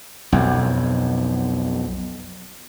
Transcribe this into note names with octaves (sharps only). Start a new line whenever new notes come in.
B1 F2